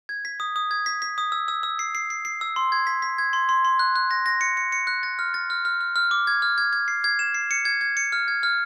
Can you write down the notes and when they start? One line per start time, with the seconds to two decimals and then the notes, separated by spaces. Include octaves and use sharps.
0.09 G#6
0.25 B6
0.40 D#6
0.56 D#6
0.71 G#6
0.86 B6
1.02 B6
1.18 D#6
1.32 E6
1.48 E6
1.63 E6
1.79 C7
1.95 C7
2.10 C7
2.25 C7
2.41 E6
2.56 C6
2.72 G#6
2.87 B6
3.02 B6
3.18 G#6
3.33 C6
3.49 C6
3.65 C6
3.79 F#6
3.96 F#6
4.11 A#6
4.26 A#6
4.41 C#7
4.57 C#7
4.72 C#7
4.87 F#6
5.03 A6
5.19 F6
5.34 A6
5.50 F6
5.65 F6
5.81 F6
5.96 F6
6.11 D6
6.27 G#6
6.42 F6
6.58 G#6
6.73 G#6
6.88 C7
7.04 G#6
7.19 E7
7.35 C7
7.51 C#7
7.65 G#6
7.81 G#6
7.97 C#7
8.12 F6
8.28 G#6
8.43 F6